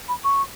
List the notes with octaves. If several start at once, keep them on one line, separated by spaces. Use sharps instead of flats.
B5
C#6